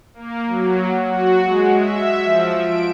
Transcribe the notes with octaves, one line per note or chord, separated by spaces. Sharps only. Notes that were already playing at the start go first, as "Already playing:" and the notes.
A#3
F#3
F#4
G#3
E5
F3
D7